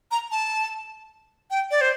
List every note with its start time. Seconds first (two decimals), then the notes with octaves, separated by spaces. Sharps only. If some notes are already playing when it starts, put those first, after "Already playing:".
0.11 A#5
0.31 A5
1.51 G5
1.71 D5
1.81 C5